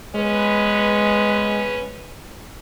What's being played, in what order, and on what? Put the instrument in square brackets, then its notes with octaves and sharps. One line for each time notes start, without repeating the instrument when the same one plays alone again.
[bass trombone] G#3 [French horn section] B3 C#4 B4